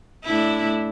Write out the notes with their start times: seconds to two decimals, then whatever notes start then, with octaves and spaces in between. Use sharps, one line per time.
0.24 A2 D4 E4